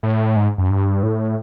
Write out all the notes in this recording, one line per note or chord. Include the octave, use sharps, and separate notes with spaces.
A2
G#2
F#2
G2
A2